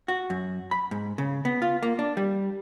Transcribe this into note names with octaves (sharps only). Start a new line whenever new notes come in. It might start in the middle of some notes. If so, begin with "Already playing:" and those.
F#4
F#2
B5
G#2
C#3
B3
F4
A#3
D4
G3